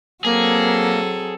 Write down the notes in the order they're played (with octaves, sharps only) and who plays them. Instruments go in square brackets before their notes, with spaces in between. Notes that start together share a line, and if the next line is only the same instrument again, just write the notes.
[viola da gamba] F#3 C4 A4 [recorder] A#3 [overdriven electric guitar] G#4